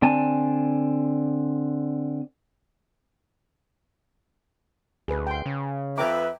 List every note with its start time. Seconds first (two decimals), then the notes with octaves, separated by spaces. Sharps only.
0.02 D3 C4 D5 G#5 A5
5.08 D2 G#4 B4
5.27 G5 C6
5.46 C#3
5.98 F2 B4 E5 G5 A#5 D6